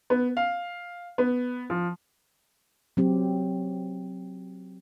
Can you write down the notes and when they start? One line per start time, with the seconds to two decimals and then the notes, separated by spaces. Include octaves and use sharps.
0.10 B3
0.37 F5
1.18 B3
1.70 F3
2.97 F#3 C4 G4